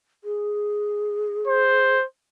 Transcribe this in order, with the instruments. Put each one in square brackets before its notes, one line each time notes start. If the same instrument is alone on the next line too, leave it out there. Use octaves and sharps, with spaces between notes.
[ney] G#4
[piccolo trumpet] C5